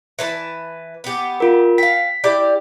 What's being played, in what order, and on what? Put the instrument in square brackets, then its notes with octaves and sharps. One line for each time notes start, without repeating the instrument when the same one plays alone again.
[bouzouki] E3 B4 A5
B3 G4
[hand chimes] F4 A#4
[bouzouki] F5 G5 [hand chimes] B6
[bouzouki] E4 G4 D5